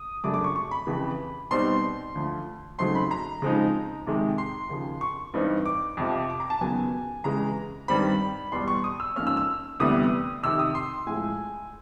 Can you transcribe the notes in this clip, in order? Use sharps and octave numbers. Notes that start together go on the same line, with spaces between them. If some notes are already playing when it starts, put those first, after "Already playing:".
Already playing: D#6
F#2 C#3 F#3 A3 D4 D6
D6
C#6
C#6
B5
F2 C#3 E3
B2 G3 C4 D#4 C6
D2 D3 F3
C#3 F#3 A3 C4 D#4 C6
B5
A#5
C#3 F3 G#3 C4 D#4
F2 C3 D#3 G#3
C6
D#2 C#3 F3
C#6
G2 E3 G3 C4 D#4
D6
F2 C3 F3
D6
A#5
A5
D#2 C#3 F#3 B3 G#5
F2 C#3 E3 G#3 A#5
G2 D#3 G3 C4 B5
E2 B2 G3 C6
C#6
D#6
E6
G#2 F3 A#3 C#4 F6
E6
E6
D2 C3 E3 G3 B3 D#6
F2 C3 D#3 E6
D#6
C6
A2 F3 G#3 G#5